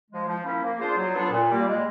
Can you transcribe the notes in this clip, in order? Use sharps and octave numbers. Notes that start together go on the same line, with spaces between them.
F3 G#3
F3
A#3 C#4 E4
A#3
D4 F4 G#4 C5
F#3
B3 D4 F4 A4
A#2
G3 A#3
G#3